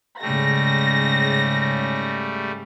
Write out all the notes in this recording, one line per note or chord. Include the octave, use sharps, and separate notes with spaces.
G#2 C#3 G3 A3 A#6